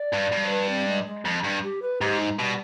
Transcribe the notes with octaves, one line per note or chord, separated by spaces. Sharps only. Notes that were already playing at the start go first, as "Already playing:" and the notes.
Already playing: D5
G2
G2
C5
B4
C4
G#3
G#3
F2
G2
G4
B4
G#2 G4
D#4
B2 G3